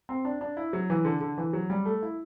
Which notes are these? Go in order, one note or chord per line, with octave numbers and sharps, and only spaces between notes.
C4
D4
D4
E4
F#3
E3
D3
D3
E3
F#3
G3
A3
E4